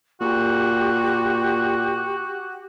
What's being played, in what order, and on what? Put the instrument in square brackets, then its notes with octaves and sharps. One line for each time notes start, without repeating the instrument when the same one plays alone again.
[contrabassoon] A#2 [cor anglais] F#4 [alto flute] G4